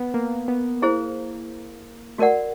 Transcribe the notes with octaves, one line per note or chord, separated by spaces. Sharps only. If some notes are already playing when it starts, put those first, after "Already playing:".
Already playing: B3
A#3
B3
A#3 E4 G#4 C5
A3 F#4 A#4 D5 F#5